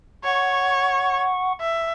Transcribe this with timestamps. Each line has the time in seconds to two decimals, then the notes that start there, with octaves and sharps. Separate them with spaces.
0.25 C#5 F#5 C#6
1.61 E5